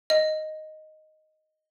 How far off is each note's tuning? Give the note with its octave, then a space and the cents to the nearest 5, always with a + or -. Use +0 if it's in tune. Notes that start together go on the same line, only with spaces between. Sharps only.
D#5 +0